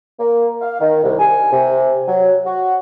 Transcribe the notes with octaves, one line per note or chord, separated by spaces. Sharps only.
A#3
F5
D#3
C2
G#5
C3
F#3
F#4